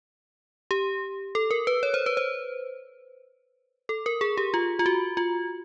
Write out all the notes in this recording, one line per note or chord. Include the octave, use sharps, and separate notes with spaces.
G4
A4
A#4
B4
C#5
C5
B4
C5
A4
A#4
G#4
G4
F4
F4
F#4
F4